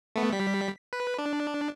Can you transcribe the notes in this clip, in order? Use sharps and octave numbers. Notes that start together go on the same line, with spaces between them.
A3 B3
G3 B6
B4
D4